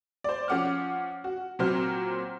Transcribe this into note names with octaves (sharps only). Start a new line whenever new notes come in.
C5 D5
F3 C#4 F#5 D6 F6
F#4
A#2 F#3 C4 C5 F6